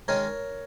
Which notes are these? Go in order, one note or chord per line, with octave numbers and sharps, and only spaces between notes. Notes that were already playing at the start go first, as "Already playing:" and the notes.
D#3 G#3 C#4 A#4 C#5